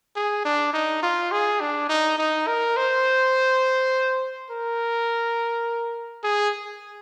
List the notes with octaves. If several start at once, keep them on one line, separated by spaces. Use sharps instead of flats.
G#4
D4
D#4
F4
G#4
D4
D#4
D#4
A#4
C5
A#4
G#4